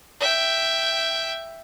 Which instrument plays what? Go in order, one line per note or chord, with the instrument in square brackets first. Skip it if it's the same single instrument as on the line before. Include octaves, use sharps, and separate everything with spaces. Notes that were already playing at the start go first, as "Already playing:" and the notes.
[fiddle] E5 G5